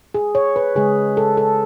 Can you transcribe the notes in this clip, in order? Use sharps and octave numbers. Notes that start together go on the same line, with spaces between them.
G#4
C#5
B4
C#3 G#3 G#4
A4
A4